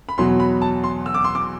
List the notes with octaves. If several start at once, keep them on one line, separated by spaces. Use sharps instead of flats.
B5
E2 B2 F#3 C6
B5
A5
C6
E6
D6
C6
D6